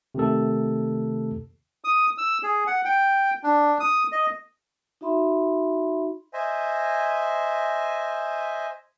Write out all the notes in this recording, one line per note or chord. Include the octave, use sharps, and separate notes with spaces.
C3 D#3 A3 A4
D#6
E6
G#4
F#5
G5
D4
D#6
D#5
D#4 F#4 E5 B5 C6
C5 D#5 E5 G#5